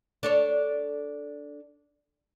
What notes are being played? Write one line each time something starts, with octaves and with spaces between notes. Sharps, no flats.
D4 A4 C#5